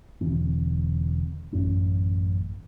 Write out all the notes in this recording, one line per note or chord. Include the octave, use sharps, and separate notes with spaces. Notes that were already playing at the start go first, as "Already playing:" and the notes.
E1 D3 E3 C4
A1 F#2 C#4